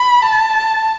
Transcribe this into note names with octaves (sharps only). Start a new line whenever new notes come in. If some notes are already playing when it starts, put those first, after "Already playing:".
Already playing: B5
A5